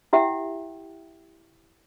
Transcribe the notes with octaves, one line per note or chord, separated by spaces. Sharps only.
E4 G4 E5 F#5 G5